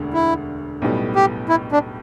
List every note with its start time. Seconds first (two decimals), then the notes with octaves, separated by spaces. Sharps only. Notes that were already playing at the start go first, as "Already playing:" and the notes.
Already playing: E1 D2 D3
0.14 E4
0.82 B1 A2 G3 B3
1.15 G4
1.49 E4
1.72 D4